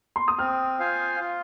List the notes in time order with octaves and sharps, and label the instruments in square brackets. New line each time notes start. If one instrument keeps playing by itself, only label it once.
[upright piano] C6
D#6
[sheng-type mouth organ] C4 [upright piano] F6
[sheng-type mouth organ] F4 C5 F5 G#5
F4